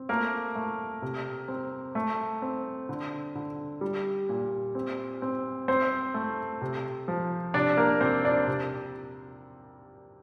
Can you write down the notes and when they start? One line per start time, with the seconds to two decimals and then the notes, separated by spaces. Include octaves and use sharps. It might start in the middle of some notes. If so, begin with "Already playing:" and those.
Already playing: C4
0.09 A3 A#3 A#4
0.56 A3
1.02 C3
1.48 C4
1.95 A3
2.42 C4
2.89 D3
3.35 D3
3.81 G3
4.29 A#2
4.75 C4
5.22 C4
5.68 C4 C5
6.14 A3
6.61 C3
7.08 F3
7.54 C3 D4 D5
7.77 A#3 A#4
8.01 C3 C4 C5
8.25 D4 D5
8.47 C3